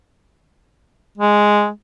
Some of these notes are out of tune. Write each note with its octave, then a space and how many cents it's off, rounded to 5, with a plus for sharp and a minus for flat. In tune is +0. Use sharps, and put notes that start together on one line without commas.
G#3 +0